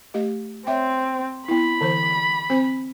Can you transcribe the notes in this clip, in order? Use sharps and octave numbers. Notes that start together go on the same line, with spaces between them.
A3 G4 D#5
C4 C#5 E5 G5
B3 E4 B5
D3 E3 C5
C4 C5